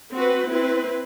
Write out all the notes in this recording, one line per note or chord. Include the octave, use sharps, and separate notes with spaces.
C4 F#4 B4
C4 E4 B4